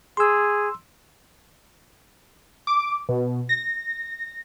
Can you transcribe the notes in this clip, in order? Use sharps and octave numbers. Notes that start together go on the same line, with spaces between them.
G#4 C6 E6
D6
B2
A#6